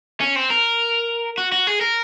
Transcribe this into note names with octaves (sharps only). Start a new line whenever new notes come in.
C#4
C4
A#4
F#4
F#4
G#4
A#4